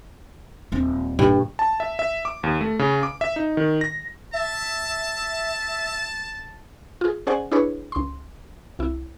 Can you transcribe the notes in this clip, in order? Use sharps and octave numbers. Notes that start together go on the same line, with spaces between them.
D#1 C4
G2 A#2 D3
A5
E5
E5
D6
D#2
A3
C#3
D6
E5
D#4
D#3
A#6
E5 A5
F4 G#4
C#4 G#4 C5 D5 F#5 G#5
D4 E4 G#4 B4 C#5
C#2 C6
C2 E4